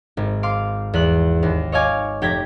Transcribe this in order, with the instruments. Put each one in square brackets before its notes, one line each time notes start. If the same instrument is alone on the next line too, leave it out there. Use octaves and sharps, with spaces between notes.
[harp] G#1
F5 C6 D6
E2 F#6
D#2
C#5 D#5 F5 G#5 D6
F1 G4 G5 G#6 A#6 B6